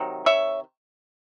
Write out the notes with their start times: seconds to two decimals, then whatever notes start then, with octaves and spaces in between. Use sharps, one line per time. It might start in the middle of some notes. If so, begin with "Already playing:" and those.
Already playing: C3 D#3 F#3
0.26 C#5 E5